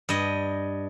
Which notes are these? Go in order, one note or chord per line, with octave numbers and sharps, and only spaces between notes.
G2 D#5